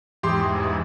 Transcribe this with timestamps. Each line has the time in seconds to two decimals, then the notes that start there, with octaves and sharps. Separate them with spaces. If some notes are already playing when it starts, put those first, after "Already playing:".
0.23 E2 G#2 G4 C6
0.55 A1